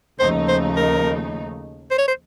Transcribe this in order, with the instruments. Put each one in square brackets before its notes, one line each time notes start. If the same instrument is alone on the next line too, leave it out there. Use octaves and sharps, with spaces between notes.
[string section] D#2 C#3 F3 A3 D#4 [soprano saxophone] C5
[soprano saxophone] C5
A#4
C5
C#5
C5